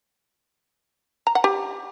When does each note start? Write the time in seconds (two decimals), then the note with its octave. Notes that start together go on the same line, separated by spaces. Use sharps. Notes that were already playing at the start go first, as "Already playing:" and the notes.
1.27 A#5
1.35 F#5
1.44 G4